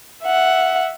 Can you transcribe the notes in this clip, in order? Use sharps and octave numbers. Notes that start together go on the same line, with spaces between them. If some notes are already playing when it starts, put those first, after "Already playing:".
E5 F#5